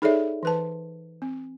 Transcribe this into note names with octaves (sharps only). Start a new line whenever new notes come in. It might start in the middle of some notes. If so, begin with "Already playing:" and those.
D#4 G#4 A4 C#5 D5 E5
E3 B4 A5
C4